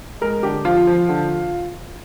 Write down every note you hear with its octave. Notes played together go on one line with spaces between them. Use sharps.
G#3 A#4
D3 G4
F3 F4
F3
D3